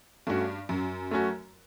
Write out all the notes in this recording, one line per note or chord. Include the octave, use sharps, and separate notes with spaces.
G2 A3 C#4 F#4
F#2 F#3
A3 C#4 F#4